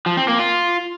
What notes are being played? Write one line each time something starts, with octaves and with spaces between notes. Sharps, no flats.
F3
C4
A#3
F4